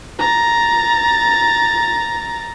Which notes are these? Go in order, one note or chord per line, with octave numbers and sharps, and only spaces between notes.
A#5 A6